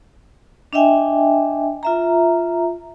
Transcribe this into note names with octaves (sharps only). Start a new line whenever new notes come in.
D4 D#5 E5 G5 G#5
F4 E5 A#5